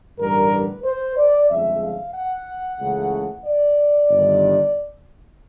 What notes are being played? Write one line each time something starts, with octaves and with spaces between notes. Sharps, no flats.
A1 G2 D3 G3 A#4
B4
C5
D5
G1 F2 C#3 F3 G#3 E5
F5
F#5
C#2 C#3 E3 A3
D5
G1 G2 D#3